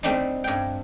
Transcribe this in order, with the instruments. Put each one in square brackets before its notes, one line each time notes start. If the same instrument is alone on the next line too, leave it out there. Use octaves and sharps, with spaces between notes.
[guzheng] G3 A3 C4 D4 D#4
G2 G5